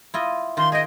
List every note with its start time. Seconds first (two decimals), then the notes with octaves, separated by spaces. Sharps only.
0.14 E4 F4 D#5
0.57 D#3 F4 C6
0.72 G#4 D#5 G5